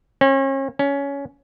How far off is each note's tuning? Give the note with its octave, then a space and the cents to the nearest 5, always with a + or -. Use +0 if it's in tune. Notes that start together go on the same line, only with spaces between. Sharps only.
C#4 -40
C#4 +15